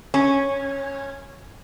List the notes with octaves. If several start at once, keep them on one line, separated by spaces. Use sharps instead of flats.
C#4